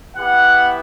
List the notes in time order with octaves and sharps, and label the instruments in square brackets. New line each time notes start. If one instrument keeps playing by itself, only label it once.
[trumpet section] B3 E4 G4 F#5